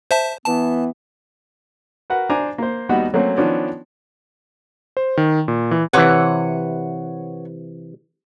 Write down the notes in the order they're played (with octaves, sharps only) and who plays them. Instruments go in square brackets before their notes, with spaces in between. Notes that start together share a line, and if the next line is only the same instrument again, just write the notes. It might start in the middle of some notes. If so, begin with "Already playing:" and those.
[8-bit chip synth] C5 E5 A5
[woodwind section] E3 B3 [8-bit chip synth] A5
[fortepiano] F#4 A#4 B4 F#5
D4 C5 G#5 A#5 D6
A#3 C5
D#2 G3 B3 D#4 F#4 B5
F#3 A3 A#3 C4 C#4
D#3 F3 B3 C#4 D4
[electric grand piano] C5
D#3
A#2
E3
[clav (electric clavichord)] C3 E3 [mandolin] B4 C#5 F#5